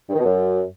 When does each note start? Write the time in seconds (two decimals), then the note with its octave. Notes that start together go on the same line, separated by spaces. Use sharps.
0.08 G2
0.13 D#3
0.18 B2
0.23 F#2